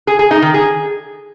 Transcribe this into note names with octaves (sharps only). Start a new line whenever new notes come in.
G#4
G#4
D#4
D#3
G#4